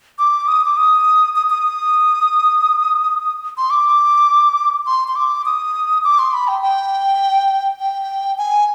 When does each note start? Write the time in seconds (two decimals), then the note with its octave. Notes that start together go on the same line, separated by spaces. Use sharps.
0.19 D6
0.48 D#6
0.65 D6
0.77 D#6
1.36 D#6
1.50 D#6
3.58 C6
3.70 D6
4.87 C6
5.08 C6
5.16 D6
5.46 D#6
6.04 D6
6.19 C6
6.33 B5
6.48 G5
6.62 G5
7.80 G5
8.38 G#5